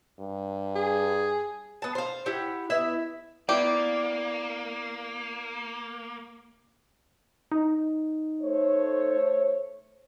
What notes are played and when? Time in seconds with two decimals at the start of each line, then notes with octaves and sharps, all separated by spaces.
0.20 G2
0.76 G#4
1.82 B3 A5
1.95 C5 F5
2.26 E4 G4 F#5
2.70 B3 E4 E5
3.49 A#3 B3 E4 G4 D5
7.52 D#4
8.41 A3 C5 C#5